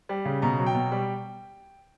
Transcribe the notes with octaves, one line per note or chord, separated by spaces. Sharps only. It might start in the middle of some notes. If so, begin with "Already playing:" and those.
G3
C#3
B2 A#5
F#3
G5
B2
G3